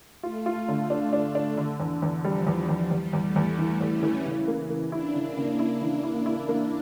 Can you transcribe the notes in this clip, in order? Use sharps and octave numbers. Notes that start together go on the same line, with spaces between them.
A3 F4
F4
D3
D4
D4
D4
D3
E2
E2
F3 G3
E2
E2
E2 G3
E2
A3
E2
E3
E2
C#4
E3
C#3
A#3
A#3
D4 E4
C#3
A#3
C#3
E4
E3
E4
E4
A#3